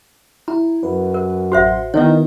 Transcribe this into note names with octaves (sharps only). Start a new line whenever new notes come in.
E4 A#5
F#2 B4
A#4
A1 F#4 C5 E5 F#5 C6
D#3 B3 D#4 E4 C#5